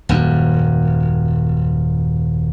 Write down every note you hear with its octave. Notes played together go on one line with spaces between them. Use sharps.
D#1 F#2